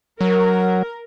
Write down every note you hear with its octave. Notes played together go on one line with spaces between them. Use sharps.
F#3 A#4